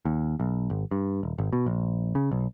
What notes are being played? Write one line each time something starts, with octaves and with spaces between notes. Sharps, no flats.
D#2
B1
G#1
G2
D#1
G#1
B2
A#1
C#3
B1